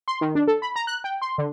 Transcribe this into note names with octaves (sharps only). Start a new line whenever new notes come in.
C6
D#3
D4
A4
B5
A#5
F#6
G5
C6
D3